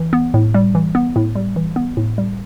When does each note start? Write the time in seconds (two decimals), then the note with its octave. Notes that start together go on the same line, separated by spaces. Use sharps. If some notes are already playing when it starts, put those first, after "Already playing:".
Already playing: E3
0.13 B3
0.34 A2
0.54 G3
0.75 E3
0.95 B3
1.16 A2
1.35 G3
1.56 E3
1.76 B3
1.97 A2
2.18 G3